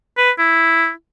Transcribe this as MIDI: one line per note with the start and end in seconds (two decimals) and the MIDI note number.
0.18 0.31 71
0.39 0.90 64